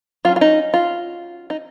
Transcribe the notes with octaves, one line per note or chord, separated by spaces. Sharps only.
F#3 C#4 F4
F4
D#4
F4
D#4